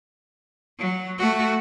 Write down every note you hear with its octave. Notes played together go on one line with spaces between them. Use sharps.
F#3
A3 F#4